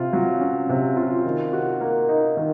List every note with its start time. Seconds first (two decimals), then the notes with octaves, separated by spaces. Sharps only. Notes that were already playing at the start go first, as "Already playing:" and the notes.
Already playing: C3 F4
0.13 F#3
0.41 C#4
0.69 C3
0.97 F4
1.24 D#3
1.53 F#4
1.81 A#3
2.09 D#4
2.37 D#3